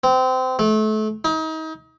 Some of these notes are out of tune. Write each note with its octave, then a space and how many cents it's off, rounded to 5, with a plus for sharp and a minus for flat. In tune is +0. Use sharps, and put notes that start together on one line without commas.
C4 -25
A3 -30
D#4 +35